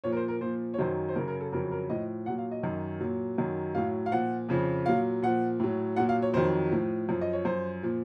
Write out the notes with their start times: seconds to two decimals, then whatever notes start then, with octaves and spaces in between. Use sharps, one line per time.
0.04 A#2 F3 C#5
0.12 A#4
0.17 C5
0.28 A#4
0.41 A#2 F3 C5
0.74 C#5
0.78 F#2 D#3 F#3 C5
1.09 C5
1.15 F#2 C#3 F#3 A#4
1.28 A#4
1.41 A4
1.52 F2 C#3 F#3 A#4
1.71 A#4
1.89 A2 F3 D#5
2.26 A#2 F#3 F#5
2.38 F5
2.51 D#5
2.63 F#2 D#3 F#3
3.00 A#2 F#3
3.38 F#2 D#3 F#3
3.75 A2 F#3 F5
4.06 F5
4.11 A#2 F3 F#5
4.49 F2 C#3 F3
4.86 A#2 F#3 F5
5.22 A#2 F3 F#5
5.60 A2 F#3
5.96 A#2 F#3 F#5
6.09 F5
6.22 C#5
6.33 F2 D#3 F#3 C5
6.71 A2 F3
7.08 F#2 F3
7.21 D#5
7.33 C#5
7.45 F#2 F3 C5
7.83 A#2 F3